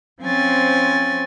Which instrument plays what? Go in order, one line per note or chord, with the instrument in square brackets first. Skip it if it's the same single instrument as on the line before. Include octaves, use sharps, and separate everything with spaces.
[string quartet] F3 C4 C#4 G#5 A6